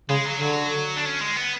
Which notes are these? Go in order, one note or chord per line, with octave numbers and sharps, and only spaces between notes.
C#3 G#3
F#3
D3
F#3
D4
C#4
G#3
B3